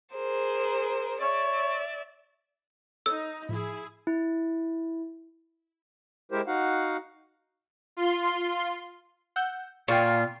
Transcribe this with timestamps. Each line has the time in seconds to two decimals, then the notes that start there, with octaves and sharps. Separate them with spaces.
0.15 G#4 A#4 C5
1.22 C#5 D5 E5
3.06 D#4 A4 C#5 E6
3.49 A2 F3 E4 G#4
4.07 E4
6.32 G#3 E4 G4 A#4 C5
6.47 D#4 F#4 F5 F#5
7.97 F4 C6
9.36 F#5 E6 G6
9.88 A#2 F4 G5 C#6